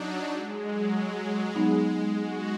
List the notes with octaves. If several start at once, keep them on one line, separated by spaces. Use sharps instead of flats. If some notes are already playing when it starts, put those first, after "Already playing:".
Already playing: F#3 D4 D#4
G#3
F#3
G#3
F#3 B3 D#4
F#4